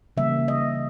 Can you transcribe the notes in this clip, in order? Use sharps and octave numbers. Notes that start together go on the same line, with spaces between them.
C#3 E3 G3 A#3 E5
D#5